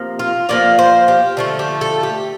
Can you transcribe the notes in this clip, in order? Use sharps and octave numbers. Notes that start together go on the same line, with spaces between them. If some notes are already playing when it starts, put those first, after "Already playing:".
Already playing: C3 F3 A#3
F4
F3 A#3 F4 D5
C5
G4
D3 F3 A3
G4
A4
G4